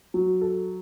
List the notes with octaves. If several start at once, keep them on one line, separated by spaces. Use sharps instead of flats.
F#3
A4